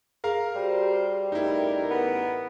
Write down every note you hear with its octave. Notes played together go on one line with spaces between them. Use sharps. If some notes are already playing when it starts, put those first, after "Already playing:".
G#4 A#4 F5 A#5
G3 F#4 G4 C5
A1 D#4 E4 A#4
B3